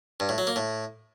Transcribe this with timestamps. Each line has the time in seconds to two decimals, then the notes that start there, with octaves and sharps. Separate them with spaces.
0.20 G2
0.29 A2
0.38 F#3
0.47 A#3
0.56 A2